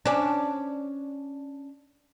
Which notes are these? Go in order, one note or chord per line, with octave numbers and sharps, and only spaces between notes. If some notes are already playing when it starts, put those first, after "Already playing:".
C#4 D4